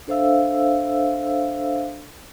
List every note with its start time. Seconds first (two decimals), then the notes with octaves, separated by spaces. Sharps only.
0.08 D4 A4 C5 E5 F5 E6